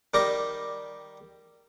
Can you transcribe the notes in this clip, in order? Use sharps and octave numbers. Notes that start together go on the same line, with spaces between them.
D#3 G3 D5 A#5